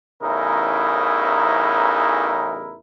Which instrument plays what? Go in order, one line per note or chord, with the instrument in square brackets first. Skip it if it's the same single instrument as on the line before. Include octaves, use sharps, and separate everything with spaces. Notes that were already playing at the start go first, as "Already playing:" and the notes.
[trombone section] A1 E2 C#3 D#4 E4 A#4